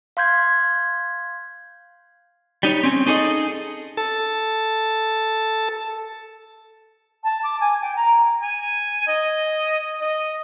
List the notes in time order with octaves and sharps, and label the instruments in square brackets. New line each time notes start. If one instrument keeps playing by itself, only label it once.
[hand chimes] F5 C6 G6 G#6
[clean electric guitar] G3 D#4 C#5
C4 C#4
D#4 G#4 A4 C#5 D#5
[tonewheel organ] A4 A5
[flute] A5
D6
G#5
G5
A#5
[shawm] G#5
D#5
D#5